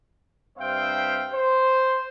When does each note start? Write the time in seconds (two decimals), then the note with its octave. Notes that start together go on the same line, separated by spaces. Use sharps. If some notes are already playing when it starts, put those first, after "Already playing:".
0.58 G2 C4 C5 E5 F5 G5
1.33 C5